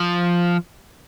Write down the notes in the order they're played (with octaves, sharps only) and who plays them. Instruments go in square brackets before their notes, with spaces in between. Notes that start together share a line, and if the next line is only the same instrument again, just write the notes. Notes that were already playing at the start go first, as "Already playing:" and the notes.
Already playing: [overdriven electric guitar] F3